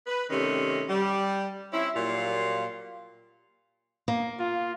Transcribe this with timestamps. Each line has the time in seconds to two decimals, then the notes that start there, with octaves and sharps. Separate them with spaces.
0.07 B4
0.30 C3 D#3 G3 A3 C#4
0.89 G3
1.73 C4 C#4 E4
1.95 A#2 F#3 G3 A#3 F4
4.08 A#3
4.39 F4